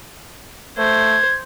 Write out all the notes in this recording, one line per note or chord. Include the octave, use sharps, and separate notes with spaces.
A3 C5 G#6